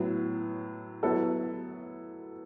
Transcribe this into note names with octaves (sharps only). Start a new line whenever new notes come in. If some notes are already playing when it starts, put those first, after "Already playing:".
Already playing: A2 F#3 B3 E4
F#3 B3 E4 A4